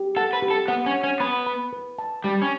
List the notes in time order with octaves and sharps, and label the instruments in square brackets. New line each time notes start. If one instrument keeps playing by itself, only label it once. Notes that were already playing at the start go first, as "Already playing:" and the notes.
Already playing: [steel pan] G4
[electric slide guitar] A4 [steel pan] F#5
[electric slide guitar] B4
[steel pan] G4
[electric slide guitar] A4
[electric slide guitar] B3 [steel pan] F#5
[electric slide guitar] C#4
[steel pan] F#5
[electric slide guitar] C#4
[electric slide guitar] B3 [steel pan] B5
[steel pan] B5
B4
A5
[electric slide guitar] G3 [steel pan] G4
[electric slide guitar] C#4